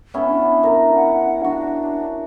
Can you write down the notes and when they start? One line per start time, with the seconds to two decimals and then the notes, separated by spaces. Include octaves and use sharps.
0.14 B3 C#4 E4
0.28 D4
0.63 A#4 A#5
0.95 F#5
1.44 D4 F#4